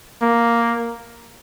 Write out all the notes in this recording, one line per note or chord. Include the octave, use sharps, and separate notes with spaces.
A#3